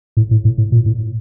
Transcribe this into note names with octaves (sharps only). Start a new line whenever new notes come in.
A2
A2
A2
A2
A#2
A2